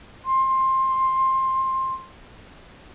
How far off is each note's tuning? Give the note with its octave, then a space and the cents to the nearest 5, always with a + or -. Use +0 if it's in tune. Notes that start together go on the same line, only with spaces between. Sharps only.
C6 +15